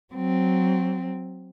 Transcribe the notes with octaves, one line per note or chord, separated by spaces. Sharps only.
F#3 C4